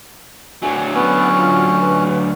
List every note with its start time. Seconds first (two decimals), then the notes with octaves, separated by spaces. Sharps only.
0.62 D2 F#3 G#5
0.94 B3 C#4
1.37 F4
1.81 B4